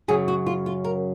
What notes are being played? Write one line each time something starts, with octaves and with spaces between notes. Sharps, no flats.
F#2 C#3 F#3 G#4
F#4
F4
F4
A#4